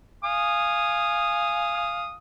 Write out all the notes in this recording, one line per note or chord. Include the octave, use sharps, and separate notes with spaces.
F5 G#5 D#6